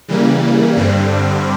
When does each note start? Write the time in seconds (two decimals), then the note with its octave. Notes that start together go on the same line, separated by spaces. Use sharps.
0.08 C#3 E3 G3 A#3
0.77 G2 D3 G3 C4